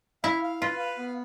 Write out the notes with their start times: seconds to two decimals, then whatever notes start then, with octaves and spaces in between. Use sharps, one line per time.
0.24 E4 F5
0.43 F5
0.61 F4 B4
0.79 F5
0.98 B3